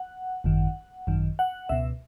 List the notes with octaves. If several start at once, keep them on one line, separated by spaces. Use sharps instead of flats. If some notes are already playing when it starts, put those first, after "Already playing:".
Already playing: F#5
G#1 F#2 D#3
G#1 F#2 D#3
F#5
C#2 B2 E5